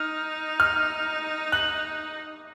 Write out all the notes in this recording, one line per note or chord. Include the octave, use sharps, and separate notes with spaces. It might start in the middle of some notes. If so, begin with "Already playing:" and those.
Already playing: D#4 F6
F6
F#6